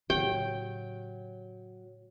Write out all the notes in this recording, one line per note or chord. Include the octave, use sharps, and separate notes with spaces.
A2 C#3 F#3 G4 G5